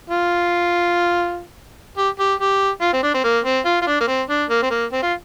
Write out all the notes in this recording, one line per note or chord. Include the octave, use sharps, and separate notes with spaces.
F4
G4
G4
G4
F4
C4
D4
C4
A#3
C4
F4
F4
D4
A#3
C4
D4
A#3
C4
A#3
C4
F4